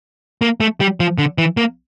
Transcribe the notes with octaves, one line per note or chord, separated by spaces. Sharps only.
A#3
A3
G3
F3
D3
E3
A#3